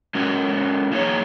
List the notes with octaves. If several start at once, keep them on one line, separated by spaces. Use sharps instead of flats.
G#3 C#4 F#4 A#4
F#3 A#3 D#4 G#4 C#5